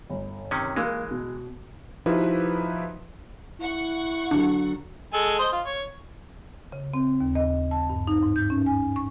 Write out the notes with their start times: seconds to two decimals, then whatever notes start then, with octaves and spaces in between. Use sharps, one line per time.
0.10 G1
0.51 C3 D#3 C#4
0.76 E3 G#3 A#3
1.11 B2
2.06 F3 D#4 E4 F#4 G4 B4
3.61 E4 F#5 C#6
4.31 D3 F#3 D4
5.14 G#3 A4 G#5
5.39 C5 D#5
5.52 F4
5.66 C#5
6.72 C#3
6.94 C4
7.21 D#2
7.35 D#5
7.71 A5
7.90 G2
8.07 D#4
8.23 G#2
8.36 G6
8.50 C#4
8.66 G#5
8.96 C#6